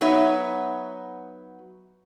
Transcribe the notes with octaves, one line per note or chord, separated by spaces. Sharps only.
F#3 B3 D#4 B4 C#5 E5